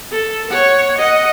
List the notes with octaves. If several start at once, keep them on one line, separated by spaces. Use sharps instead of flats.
A4
C#5 F#5
D#5 F#5